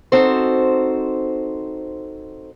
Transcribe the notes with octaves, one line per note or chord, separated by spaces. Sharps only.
C4 D#4 F#4 A4 C5